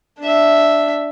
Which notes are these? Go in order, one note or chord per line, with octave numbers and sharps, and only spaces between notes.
D4 E5